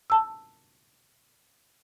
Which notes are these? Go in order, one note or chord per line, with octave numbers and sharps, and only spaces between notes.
A5 E6